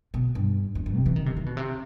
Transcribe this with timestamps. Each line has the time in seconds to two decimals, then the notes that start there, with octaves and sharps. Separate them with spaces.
0.14 B2
0.35 G2
0.75 E2
0.86 F#2
0.96 C3
1.06 E3
1.16 D#3
1.26 C3
1.37 D#3
1.46 B2
1.57 C3